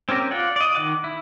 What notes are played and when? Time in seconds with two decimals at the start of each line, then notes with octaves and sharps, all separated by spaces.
0.09 C4 C#4 G4 A#4
0.31 F4 D5 F#5
0.56 D5 D#5
0.75 D#3 F#5 D6
1.04 E4